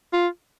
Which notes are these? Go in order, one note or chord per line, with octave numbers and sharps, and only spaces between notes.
F4